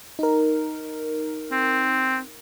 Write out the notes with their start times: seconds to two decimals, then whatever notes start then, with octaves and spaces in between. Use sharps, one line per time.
0.19 D#4 A#4
1.52 C4